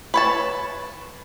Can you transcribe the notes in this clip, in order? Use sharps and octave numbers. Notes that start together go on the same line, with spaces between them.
B4 C#5 A5